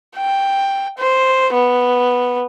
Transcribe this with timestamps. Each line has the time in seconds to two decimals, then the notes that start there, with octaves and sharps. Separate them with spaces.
0.16 G5
0.98 C5
1.53 B3